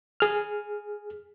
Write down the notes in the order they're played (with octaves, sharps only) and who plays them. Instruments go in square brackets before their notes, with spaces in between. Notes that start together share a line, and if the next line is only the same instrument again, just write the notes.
[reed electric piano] G#4 F6